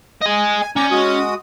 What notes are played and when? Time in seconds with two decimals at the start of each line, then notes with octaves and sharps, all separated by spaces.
0.22 D#5 G#5
0.61 G#5
0.76 C#4 D5 A#5 G6
0.91 G#3 F#4 D#6